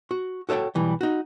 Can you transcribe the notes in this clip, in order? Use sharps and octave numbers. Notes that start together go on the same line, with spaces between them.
F#4
F#4 A4 C#5 D#5 G5
B1 E3 G3
D#4 F#4